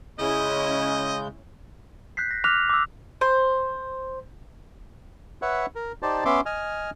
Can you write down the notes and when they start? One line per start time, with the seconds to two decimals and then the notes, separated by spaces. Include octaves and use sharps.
0.19 C#3 G#3 C#4 E4 D#5 G6
2.17 F#6 G6 B6 C7
2.31 A#6
2.44 D6 F6 F#6 A#6 B6 F7
2.69 D6 E6
3.21 C5
5.42 B4 C#5 E5 F#5
5.75 A#4
6.02 D#4 G4 C5 D5 A5
6.25 B3 C#4 E5 C6 D6
6.46 D#5 G#5 F6